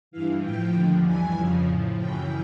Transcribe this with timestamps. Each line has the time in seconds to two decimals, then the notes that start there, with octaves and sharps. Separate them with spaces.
0.11 G2 E3 F5
0.42 A2 F3 G5
0.74 D#2 D3 F3
1.04 G2 E3 G#5
1.36 F2 C#3 F3
1.67 A2 F3
1.98 F#2 C#3 E3 G5